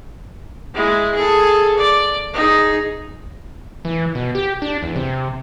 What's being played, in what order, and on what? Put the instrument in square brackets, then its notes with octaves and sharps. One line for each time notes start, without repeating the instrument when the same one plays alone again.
[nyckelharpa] G#3 E4
G#4 A4
D5
D#4 G#4
[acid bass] E3
B2
G4
D4
E2
C3